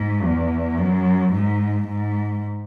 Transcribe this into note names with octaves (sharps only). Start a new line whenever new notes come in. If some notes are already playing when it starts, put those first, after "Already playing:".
Already playing: G#2
E2
F#2
G#2
G#2